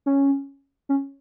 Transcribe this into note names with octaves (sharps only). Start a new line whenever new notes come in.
C#4
C#4